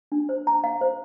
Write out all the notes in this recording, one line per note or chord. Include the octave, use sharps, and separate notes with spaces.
D4
C5
A#5
F5
C5